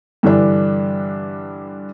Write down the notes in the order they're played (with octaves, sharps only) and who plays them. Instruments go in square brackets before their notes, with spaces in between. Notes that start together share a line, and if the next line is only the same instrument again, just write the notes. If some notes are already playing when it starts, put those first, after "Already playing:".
[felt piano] G2 D3 E3 D4